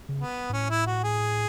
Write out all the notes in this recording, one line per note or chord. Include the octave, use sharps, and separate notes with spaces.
C#3
B3
G#2
A2 C#4
E4
F#4
G#4